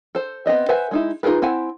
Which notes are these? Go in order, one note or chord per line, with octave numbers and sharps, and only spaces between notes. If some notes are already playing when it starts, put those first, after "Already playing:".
A4 C5
B3 C4 D#5 E5
B4 C5 E5 F#5 G#5
G#3 D#4 E4
D#4 F4 G#4 A#4 B4
C4 E4 F#5 G#5